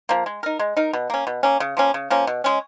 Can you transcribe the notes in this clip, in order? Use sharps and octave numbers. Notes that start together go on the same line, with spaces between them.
F3 A#3
G#3
D#4 A#4
G#3
D#4 A#4
B2
A#3 C#4
B2
A#3 C#4
C#3
F3 A#3 C#4
C#3
F3 A#3 C#4
B2
G#3 C#4